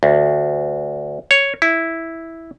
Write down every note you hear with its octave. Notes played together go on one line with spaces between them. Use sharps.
D2
C#5
E4